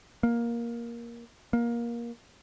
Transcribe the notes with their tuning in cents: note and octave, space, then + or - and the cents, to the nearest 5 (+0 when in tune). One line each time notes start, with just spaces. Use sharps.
A#3 +10
A#3 +20